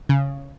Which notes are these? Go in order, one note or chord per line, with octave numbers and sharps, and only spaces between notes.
C#3